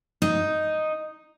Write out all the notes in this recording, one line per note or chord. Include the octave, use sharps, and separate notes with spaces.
D#4